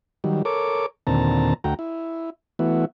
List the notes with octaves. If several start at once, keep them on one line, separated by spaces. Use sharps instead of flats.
D#3 F#3 G3
A4 A#4 C#5 D6
D#2 A#2 D3 C4 A5 A#5
D2 A3 F#4 G5 A#5
E4
E3 A3 B3 E4 F#4